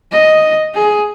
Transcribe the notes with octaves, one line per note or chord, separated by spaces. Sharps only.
D#5
G#4